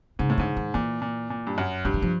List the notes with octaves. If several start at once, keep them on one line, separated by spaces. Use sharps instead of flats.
G#2 C#3
A2
G#2 D3
D#3
A#2 E3
A#2
A#2
G2
F#2
G2 F3
E3
F3